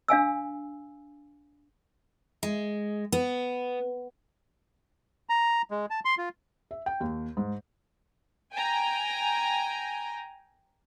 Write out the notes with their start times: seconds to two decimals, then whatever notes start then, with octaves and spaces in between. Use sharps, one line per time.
0.08 D4 F5 G#5 E6
2.43 G#3
3.12 B3
5.29 A#5
5.71 G#3
5.90 A5
6.05 C6
6.18 F4
6.71 E5
6.86 G5
7.00 D#2
7.37 G#2
8.53 G5 G#5 A#5